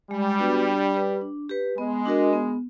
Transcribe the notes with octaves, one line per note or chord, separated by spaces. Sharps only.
G3 G#3
B3 D4 F#4 B4
D4
G4 B4
D4
G4 B4
G#3 B3
D4 F#4 A#4 D#5
B3